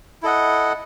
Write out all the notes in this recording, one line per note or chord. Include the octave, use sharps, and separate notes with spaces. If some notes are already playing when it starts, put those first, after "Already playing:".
E4 A4 D#5 F#5